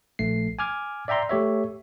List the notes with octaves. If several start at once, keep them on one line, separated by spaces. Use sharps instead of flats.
A#1 A3 C7
G#5 D6 F6 G#6
D5 E5 G5 A#5 C6
A3 G4 C#5 E5